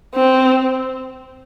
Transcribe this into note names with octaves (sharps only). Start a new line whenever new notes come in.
C4